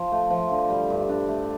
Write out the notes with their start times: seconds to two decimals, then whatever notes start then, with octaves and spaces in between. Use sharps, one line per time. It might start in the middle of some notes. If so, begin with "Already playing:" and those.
Already playing: F3
0.12 A3
0.31 F3
0.51 D3
0.70 G3
0.90 G2
1.09 D4
1.29 A3